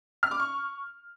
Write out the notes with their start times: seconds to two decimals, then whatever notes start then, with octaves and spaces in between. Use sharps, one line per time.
0.23 F6
0.31 D6
0.40 C#6